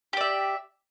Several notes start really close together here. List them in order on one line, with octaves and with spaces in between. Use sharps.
G4 D5 E5